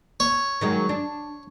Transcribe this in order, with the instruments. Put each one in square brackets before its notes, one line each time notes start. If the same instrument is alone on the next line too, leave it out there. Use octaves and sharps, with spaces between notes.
[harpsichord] C#5
[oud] D#3 F#3 G#3
D4